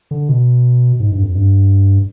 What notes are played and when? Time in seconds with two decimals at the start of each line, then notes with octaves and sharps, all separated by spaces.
0.11 D3
0.29 B2
1.00 G#2
1.12 G2
1.23 F2
1.35 G2